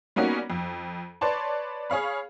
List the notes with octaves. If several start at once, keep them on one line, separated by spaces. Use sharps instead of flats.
G3 A#3 B3 C#4 D#4 F#4
F2
B4 C#5 D5 A5 C6
G#4 C#5 F5 B5